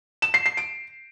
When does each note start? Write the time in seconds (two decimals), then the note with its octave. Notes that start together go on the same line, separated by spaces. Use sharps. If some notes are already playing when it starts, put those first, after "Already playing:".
0.22 E7
0.34 C7
0.46 C7
0.57 D7